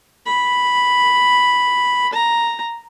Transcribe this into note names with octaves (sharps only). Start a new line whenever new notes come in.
B5
A#5